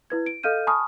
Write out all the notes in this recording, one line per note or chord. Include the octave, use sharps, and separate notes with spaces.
E4 B4 G#6
D7
A4 D#5 F5 F6 G6 D#7
G#5 A5 B5 C#6 D#6 F6